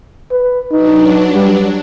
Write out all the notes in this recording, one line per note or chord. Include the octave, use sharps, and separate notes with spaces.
B4
F#3 D4 D#4 B4
G3